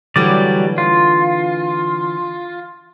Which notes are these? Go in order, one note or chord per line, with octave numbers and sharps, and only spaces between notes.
D3 E3 F#3 G3 A3 D5
F4